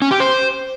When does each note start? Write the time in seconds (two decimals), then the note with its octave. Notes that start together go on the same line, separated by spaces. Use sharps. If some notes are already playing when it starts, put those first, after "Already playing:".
0.02 C#4
0.11 G4
0.20 C5